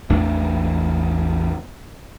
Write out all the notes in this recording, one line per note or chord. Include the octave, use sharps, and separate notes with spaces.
A1 E2 A2 D4